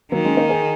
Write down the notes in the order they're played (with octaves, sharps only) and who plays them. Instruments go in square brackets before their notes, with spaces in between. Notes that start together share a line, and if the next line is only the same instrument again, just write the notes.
[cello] D#3 [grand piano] F#3 A#3
[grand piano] G#3 C#4
A#3 D#4
D#4 G#4